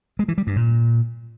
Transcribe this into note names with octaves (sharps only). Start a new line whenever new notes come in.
G#3
E3
G3
G2
A#2